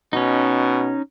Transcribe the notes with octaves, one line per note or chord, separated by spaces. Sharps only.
B2 C#4 D#4